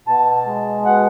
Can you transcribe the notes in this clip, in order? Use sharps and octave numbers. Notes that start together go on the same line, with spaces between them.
B2 A5
G#3
B2 F#5